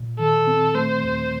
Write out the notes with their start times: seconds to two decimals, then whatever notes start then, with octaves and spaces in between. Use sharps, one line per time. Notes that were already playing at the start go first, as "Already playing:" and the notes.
Already playing: A#2
0.19 D#3 A4
0.47 C4
0.75 A3 C5
1.03 D#2